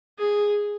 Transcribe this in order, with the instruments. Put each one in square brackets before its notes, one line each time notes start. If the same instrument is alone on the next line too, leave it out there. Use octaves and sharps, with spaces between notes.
[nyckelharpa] G#4